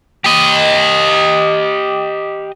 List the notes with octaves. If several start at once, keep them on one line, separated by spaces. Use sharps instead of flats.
G4 D#5